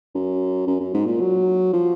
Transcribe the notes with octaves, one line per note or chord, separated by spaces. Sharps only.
F#2
F#2
F#2
G#2
A#2
F#3
F3